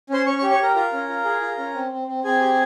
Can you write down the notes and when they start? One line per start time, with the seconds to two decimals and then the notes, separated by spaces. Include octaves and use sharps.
0.10 C#4 C5 C6
0.26 C#4 C#5 C#6
0.38 C#5 C#6
0.42 G4
0.51 C#5 C#6
0.59 G4 A#4 A#5
0.76 F4 A#4 A#5
0.93 C#4
1.09 F4
1.25 G#4
1.42 F4
1.58 C#4
1.75 C4
1.91 C4
2.08 C4
2.24 C4 G#4 G#5
2.41 G4